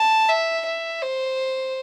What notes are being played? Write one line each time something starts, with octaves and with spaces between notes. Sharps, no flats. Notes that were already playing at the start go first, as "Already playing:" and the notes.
Already playing: A5
E5
E5
C5